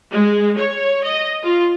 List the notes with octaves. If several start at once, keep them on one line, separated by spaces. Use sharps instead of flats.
G#3
C#5
D#5
F4